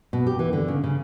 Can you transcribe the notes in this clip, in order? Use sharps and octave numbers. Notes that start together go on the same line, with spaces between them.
B2
G4
E3
D3
C#3
C#3